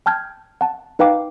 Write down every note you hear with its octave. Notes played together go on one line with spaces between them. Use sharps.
G5 A5 F6 G6 G#6
F#5 A5
D#4 B4 F5 G5 D6